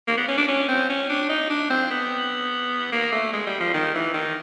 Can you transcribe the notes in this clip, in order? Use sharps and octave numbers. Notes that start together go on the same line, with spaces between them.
A#3
B3
C#4
D4
C#4
C4
C#4
D4
D#4
D4
C4
B3
A#3
A3
G#3
G3
F3
D#3
E3
D#3